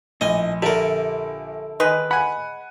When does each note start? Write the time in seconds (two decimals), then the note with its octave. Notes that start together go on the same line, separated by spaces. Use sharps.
0.21 A#1 A2 D#5 G#5
0.62 D3 G4 A4 A#4 E5
1.80 D#3 G#3 D#4 B4
2.11 F#5 G#5 B5